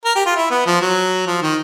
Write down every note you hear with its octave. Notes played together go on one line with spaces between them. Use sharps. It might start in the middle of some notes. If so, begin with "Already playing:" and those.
A#4
G4
F4
E4
B3
F3
F#3
F3
D#3